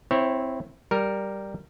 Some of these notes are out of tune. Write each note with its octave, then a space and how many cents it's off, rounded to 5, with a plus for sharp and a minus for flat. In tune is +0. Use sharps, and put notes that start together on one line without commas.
C4 +0 E4 +0 C#5 -25
G3 +0 A#4 +0